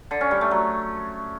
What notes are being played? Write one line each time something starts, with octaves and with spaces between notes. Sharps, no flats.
D3
C#4
G3
A3
F#3